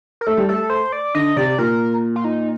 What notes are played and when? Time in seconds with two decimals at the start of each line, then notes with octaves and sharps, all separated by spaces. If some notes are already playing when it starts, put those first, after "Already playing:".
0.21 A#4
0.27 A3 A4
0.37 G3
0.49 A3 A4
0.70 C5
0.92 D5
1.15 D3 D#5
1.36 C3 D5
1.58 A#2 A#4
2.16 F4
2.24 D#4